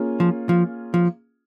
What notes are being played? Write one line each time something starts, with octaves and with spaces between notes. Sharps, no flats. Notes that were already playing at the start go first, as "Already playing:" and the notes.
Already playing: A#3 C#4 F4 G#4
F3
F3
F3